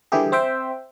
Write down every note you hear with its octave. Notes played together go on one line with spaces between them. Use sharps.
D3 E3 G3 E4 G4 G#4
C4 C5 E5 G5